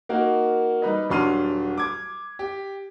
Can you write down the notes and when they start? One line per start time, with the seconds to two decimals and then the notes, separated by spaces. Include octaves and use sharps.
0.09 A#3 D#4 F#4 A#4
0.82 G3 D#4 B4 D#5
1.10 D#1 F#3 D4 C6 F6 D#7
1.78 D6 G#6
2.39 G4